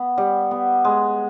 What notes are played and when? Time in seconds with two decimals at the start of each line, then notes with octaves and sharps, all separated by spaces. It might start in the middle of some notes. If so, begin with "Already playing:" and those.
Already playing: B3
0.18 G3
0.51 B3
0.85 G#3